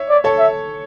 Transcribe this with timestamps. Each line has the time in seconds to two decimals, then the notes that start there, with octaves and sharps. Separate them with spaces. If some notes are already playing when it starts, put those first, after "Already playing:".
Already playing: C#5 E5
0.09 D5
0.24 A4 C#5
0.39 E5